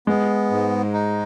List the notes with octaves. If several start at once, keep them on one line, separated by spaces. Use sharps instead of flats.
G#3 B3
G#2
D#4